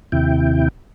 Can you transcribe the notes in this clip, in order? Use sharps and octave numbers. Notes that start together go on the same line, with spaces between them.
D#2 C3 E4 G5